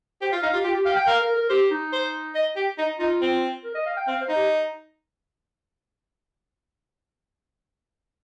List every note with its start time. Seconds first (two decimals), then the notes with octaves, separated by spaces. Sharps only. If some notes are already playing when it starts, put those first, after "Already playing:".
0.22 G4 C5
0.32 F4 F5
0.42 D#4 F5
0.53 F4 G4
0.64 F4 G4
0.75 G4
0.85 G4 F5
0.96 G5
1.07 A#4 F5
1.22 A#4
1.35 A#4
1.49 G4 C5
1.71 D#4
1.93 C5
2.35 D#5
2.56 G4
2.78 D#4
2.99 D#4 F4
3.22 C4
3.64 A#4
3.75 D#5
3.86 F5
3.97 G5
4.07 C4 F5
4.21 C5
4.29 D#4
4.35 G4